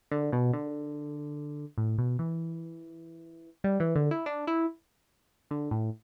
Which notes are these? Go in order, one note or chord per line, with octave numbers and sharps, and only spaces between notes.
D3
B2
D3
A2
B2
E3
G3
E3
D3
E4
D4
E4
D3
A2